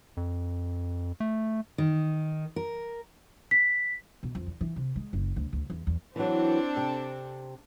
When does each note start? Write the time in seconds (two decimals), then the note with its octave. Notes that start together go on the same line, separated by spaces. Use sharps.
0.17 F2
1.20 A3
1.78 D#3
2.56 A#4
3.51 B6
4.23 B2
4.35 F2
4.47 E2
4.61 E3
4.76 C3
4.96 G#3
5.13 F#1
5.36 D2
5.53 D2
5.70 E2
5.87 E2
6.16 E3 F#3 C4 D4 A4
6.77 C3